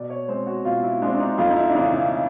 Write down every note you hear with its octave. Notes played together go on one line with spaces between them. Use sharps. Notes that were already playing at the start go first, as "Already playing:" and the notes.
Already playing: B2 D5
C#5
G#3 C4 C5
F#4
B2 F4
E4
G#3 C4 D4
D4
D#4
F2 F4
D#4
E4
D4
C#3 E3 D#4
D#4